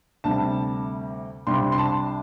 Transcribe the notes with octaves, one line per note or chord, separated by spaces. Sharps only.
D2 C3 G3 A5
C2 C3 G3 D4 C6
C6
A5